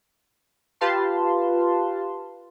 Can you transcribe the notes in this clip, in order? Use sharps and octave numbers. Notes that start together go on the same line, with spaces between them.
F4 G4 B4 F5 A5 C6